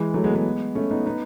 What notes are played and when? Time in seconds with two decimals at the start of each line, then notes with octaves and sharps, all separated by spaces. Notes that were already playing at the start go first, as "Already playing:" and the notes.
Already playing: E3 G#3
0.14 F#3 A3
0.24 G#3 B3
0.34 G#3 B3
0.75 A3 C#4
0.91 B3 D#4
1.06 B3 D#4